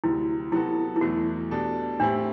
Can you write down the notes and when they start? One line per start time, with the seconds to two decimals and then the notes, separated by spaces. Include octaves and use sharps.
0.04 D2 C3 F#3 E4
0.52 C3 F#3 B3 E4 F#4 A4
0.96 E4
1.01 E2 B2 F#3 A3 F#4
1.51 B2 G3 D4 A4
2.00 A2 G3 C4 D4 E4